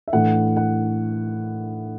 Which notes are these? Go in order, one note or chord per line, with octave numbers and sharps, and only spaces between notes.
E5
A2 E3 A3 D4 F#5
F#5